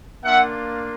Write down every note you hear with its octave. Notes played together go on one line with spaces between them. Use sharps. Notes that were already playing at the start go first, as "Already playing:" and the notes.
A#3 D4 F4 E5 F#5